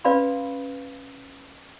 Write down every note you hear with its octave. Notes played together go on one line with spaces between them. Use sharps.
C#4 B4 D5 F5 B5 C6